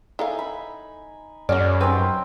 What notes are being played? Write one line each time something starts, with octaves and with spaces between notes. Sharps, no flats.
D#4 E4 A4 F5 G#5
B5
F#2 F#3 C#4 F#4 G#4 D5
C4 D#4 G4 B4